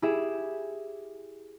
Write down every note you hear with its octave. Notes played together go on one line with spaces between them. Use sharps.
E4 G4 G#4 E5